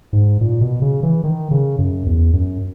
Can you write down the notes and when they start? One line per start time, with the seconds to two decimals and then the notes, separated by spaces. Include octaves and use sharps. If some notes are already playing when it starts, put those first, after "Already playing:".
0.13 G#2
0.41 A#2
0.61 B2
0.82 C#3
1.03 E3
1.24 D#3
1.51 C#3
1.79 F#2
2.06 E2
2.33 F#2